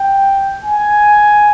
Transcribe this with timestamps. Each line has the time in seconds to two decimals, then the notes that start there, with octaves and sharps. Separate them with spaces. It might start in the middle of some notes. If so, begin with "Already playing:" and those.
Already playing: G5
0.64 G#5